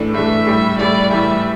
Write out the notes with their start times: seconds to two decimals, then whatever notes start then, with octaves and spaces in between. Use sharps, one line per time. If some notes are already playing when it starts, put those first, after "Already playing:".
Already playing: A2 E3 A3 D4
0.14 A2 E3 A3 D4 E5
0.47 A2 G3 E4
0.79 A2 G3 E4 D5
1.11 A2 E3 G3 E5